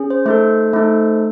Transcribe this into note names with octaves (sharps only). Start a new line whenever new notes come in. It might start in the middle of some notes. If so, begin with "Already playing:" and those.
Already playing: C#4 G#4
C5
A3 D#4 A4 C5
A3 D#4 A4